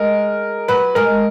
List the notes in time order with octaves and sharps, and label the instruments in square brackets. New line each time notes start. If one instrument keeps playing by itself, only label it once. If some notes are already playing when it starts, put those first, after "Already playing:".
Already playing: [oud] G#3 G#4 [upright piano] A#4
[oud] F#3 F#4 [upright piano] B4
[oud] G#3 G#4 [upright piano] A#4